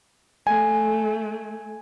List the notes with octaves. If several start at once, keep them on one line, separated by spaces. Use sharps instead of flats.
A3 G#5